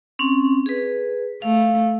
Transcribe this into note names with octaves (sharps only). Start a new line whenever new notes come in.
C4 C#4
G#4 B4
A3 F5